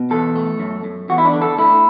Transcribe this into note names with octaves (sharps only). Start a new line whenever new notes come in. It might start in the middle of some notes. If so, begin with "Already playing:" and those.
Already playing: B2
E2 A4
A3
F#2
F#2
E2 F#4
E4
D4
D3
A4
A3 E4